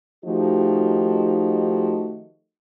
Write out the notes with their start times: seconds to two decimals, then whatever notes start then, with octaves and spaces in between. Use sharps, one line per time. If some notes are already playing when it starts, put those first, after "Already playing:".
0.24 D#3 F3 A3 D#4 F#4 G4